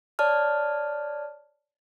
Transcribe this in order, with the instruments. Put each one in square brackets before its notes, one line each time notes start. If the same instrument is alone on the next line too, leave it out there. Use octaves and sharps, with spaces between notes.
[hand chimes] C#5 D5 A5 F6